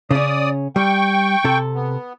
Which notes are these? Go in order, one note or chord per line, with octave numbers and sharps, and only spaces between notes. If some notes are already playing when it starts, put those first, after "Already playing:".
C#3 C#4 D5 D#6
G3 G5 C#6
C3 A4
B3